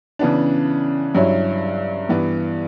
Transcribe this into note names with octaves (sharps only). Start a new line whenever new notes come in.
C#3 E3 B3 D4
G2 F#3 C#4 E4
G2 E3 B3